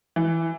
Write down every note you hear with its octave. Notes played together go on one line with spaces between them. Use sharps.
E3